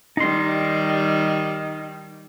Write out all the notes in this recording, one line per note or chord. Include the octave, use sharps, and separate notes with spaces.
D#3 G3 D#4 C6